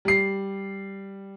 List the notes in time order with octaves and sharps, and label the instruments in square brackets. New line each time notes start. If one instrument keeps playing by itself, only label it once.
[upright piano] G3 C7